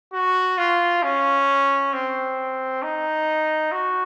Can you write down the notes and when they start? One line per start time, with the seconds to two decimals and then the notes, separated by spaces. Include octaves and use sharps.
0.13 F#4
0.58 F4
1.03 C#4
1.93 C4
2.83 D#4
3.72 F#4